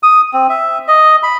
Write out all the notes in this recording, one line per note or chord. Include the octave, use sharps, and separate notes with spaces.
D#6
C4
E5
D#5
B5